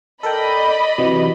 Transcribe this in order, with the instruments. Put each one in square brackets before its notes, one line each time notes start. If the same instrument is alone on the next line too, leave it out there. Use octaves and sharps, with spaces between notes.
[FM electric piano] A4 A#4 G5 [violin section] D5 D#5 B5
[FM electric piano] C3 E3 F#3